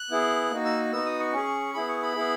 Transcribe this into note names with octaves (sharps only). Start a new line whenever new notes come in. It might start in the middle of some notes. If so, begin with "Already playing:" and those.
Already playing: F#6
B3 E4 G#4
A#3 D#4 F#4
E6
B3 D#4 F#4 E6
D#6
C#6
C#4 G#4
B3 E4 G#4 B5
C#6
B5
B3 E4 G#4